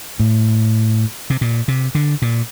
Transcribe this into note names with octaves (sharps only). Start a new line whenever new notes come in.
A2
C3
A#2
C3
D3
A#2